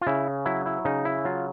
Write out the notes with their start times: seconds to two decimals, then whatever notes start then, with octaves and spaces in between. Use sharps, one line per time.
0.01 F4
0.07 C#3 E4
0.45 F#3 E4
0.66 E4
0.85 C#3 D#4
1.05 E4
1.25 F#3 F4